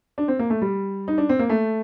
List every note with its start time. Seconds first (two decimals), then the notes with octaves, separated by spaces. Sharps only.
0.18 D4
0.28 C4
0.39 A#3
0.50 A3
0.62 G3
1.08 D#4
1.18 D4
1.29 C4
1.39 A#3
1.49 A3